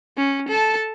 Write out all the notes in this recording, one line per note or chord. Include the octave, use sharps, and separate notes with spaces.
C#4
A4 A5